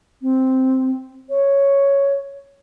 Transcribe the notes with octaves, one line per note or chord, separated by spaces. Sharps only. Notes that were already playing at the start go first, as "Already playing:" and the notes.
C4
C#5